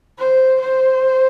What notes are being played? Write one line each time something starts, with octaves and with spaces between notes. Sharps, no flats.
C5
C5